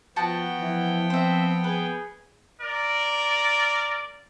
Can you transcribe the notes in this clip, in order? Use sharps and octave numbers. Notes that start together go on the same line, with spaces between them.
F3 B3 F#4 G5 A5
E3 F3
C4 C5 E5
G#4 B4
A#4 D5